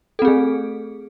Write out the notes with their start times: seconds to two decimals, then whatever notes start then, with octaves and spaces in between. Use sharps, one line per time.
0.19 A4
0.22 C4
0.25 G#4
0.28 A3